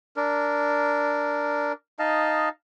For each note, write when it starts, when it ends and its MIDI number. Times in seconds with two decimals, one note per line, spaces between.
0.16 1.73 62
0.16 1.73 70
1.99 2.49 63
1.99 2.49 75
1.99 2.49 77
1.99 2.49 81